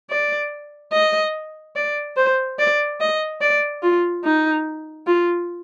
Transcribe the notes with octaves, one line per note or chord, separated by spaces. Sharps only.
D5
D#5
D5
C5
D5
D#5
D5
F4
D#4
F4